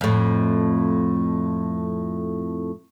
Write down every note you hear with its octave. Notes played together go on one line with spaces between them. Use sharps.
F2 A2